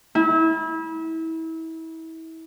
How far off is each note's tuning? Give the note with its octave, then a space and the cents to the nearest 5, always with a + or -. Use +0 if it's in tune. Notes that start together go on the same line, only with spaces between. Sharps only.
E4 -30